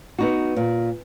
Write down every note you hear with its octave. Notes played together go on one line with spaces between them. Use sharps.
B3 D#4 F#4
A#2